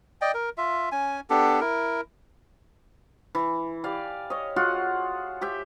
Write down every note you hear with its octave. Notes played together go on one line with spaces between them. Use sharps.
D5 D#5 G5
A#4
F4 E5
C#4 G#5
B3 D4 G4 A4
E4 A#4
E3
G4 D5 F5 G#5
C#5 D#5
F4 F#4 G#4 F#5
G4 E5 G5